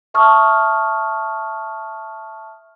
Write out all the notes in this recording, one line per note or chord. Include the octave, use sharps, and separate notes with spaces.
E5 A5 C#6 D#6 F6